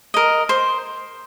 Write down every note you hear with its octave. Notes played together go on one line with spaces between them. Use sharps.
A#4 D#5
C5